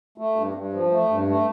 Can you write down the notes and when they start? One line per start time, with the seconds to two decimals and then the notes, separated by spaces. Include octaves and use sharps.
0.18 A3
0.36 G2
0.54 G2
0.73 F3
0.91 A3
1.09 G2
1.28 A3